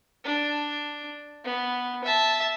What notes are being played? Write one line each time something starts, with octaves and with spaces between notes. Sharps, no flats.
D4
B3
E5 A5